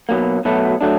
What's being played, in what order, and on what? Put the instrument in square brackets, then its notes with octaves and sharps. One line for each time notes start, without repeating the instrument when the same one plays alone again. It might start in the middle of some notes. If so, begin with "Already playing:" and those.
[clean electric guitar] B2 F#3 A#3
B2 F#3 A3
F#3 A3 D4